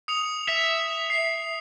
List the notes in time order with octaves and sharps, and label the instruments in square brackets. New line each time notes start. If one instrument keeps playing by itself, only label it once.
[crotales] D#6 C#7 F7
[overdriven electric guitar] E5
[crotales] C7